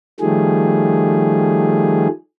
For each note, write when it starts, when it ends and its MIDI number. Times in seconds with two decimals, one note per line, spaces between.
0.20 2.08 51
0.20 2.08 53
0.20 2.08 55
0.20 2.08 57
0.20 2.08 68